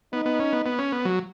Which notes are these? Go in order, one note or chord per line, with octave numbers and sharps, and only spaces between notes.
B3 D#4
B3
C#4
B3
B3
C#4
B3
F#3